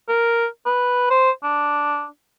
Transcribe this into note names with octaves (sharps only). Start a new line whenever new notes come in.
A#4
B4
C5
D4